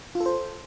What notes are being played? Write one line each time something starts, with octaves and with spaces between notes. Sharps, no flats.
F4
A4
C5